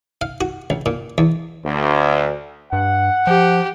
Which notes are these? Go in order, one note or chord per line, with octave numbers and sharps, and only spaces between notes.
F5
F#4
C#2
A#2
E2
D2
G2 F#5
F3 G4